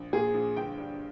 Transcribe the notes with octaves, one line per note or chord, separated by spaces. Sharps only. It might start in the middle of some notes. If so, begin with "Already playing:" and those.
Already playing: A#1
A#2 G#4
A#1
G1 G5
G2